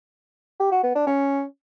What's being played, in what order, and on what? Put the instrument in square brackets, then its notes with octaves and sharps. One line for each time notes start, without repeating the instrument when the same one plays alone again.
[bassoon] G4
F#4
B3
D4
C#4